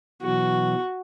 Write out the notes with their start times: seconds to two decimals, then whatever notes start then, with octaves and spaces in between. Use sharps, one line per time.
0.22 B2 E3 F#3 F#4